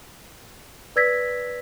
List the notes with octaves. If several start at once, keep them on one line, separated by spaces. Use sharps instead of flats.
B4 D5 E6 G#6 A#6 B6